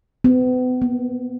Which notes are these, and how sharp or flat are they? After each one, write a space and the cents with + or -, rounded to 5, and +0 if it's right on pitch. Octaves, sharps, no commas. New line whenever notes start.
B3 +40
B3 -30